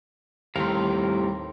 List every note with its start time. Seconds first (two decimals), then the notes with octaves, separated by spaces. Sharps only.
0.56 D#2 A2 C3 G3 A#4 F5 C6